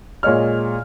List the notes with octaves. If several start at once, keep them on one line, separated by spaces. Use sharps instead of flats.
A#2 G#3 C#5 D#5 F6